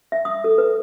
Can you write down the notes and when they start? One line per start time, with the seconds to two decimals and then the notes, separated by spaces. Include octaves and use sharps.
0.12 E5
0.25 D#6
0.44 A4
0.58 B4